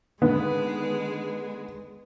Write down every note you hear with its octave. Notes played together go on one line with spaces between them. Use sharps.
D3 D#3 G#3 B3